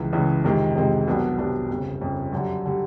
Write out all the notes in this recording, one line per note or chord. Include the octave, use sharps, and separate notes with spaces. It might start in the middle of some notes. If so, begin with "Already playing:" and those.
Already playing: C#2 C#3 E3
C#2 C#3 E3
F2 C3 D#3 G#3
F2 C3 D#3 G#3
C2 B2 F#3 B3 D4
C2 B2 F#3 B3 D4
G1 F2 C#3
G1 F2 C#3
F#2 D3 G3
D3 G3